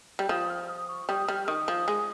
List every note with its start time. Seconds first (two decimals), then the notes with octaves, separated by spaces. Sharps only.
0.19 G3
0.29 F3 D#6
0.49 F6
0.69 D#6
0.89 C#6
1.08 G3 D#6
1.28 G3 F6
1.44 F6
1.48 D#3 D#6
1.68 F3
1.88 G#3